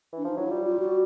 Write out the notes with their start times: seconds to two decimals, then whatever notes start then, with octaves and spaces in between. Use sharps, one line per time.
0.13 E3
0.18 D4
0.25 F3 D#4
0.37 F#3 E4
0.50 G3 F4
0.65 F4
0.79 F#4